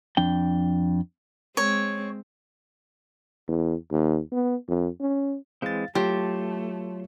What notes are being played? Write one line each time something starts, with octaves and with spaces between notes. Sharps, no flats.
F2 D4 G5
G#3 C4 C#5
E2
D#2
B3
F2
C#4
E3 G#3 C4 F5 A6
F#3 A3 F4 G4 C#5 A5 C6